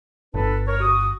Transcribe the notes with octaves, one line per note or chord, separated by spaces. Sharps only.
G1 D4 A4 B4
A#4 C#5
F#4 D#6